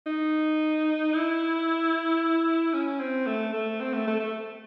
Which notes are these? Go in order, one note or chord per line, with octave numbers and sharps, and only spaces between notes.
D#4
E4
C#4
C4
A3
A3
C4
A3
A3
A3